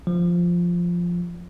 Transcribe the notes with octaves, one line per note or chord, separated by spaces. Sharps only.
F3